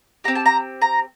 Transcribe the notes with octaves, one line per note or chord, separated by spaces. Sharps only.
C4 G4 A#5
A5
A#5
A#5